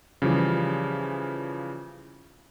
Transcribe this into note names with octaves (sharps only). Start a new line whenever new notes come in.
C#3 E3 F3 G3